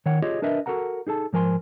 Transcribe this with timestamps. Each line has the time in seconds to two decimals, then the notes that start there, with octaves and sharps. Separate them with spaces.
0.06 D#3 C#5 F#5 G5
0.22 F4 G4 G#4 C#5 D#5
0.42 D4 A#4 B4 D#5 E5
0.66 F#4 A4 A#4 F#5 A#5
1.07 D#4 G#4 A4 A5
1.33 G#2 F3 A#4 G#5 C6